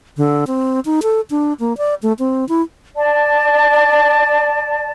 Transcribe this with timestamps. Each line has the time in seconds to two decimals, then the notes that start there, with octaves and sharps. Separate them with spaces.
0.17 D3
0.47 C4
0.85 D#4
1.03 A4
1.30 D4
1.60 A#3
1.78 D5
2.03 A3
2.19 C4
2.49 E4
2.97 D5 A5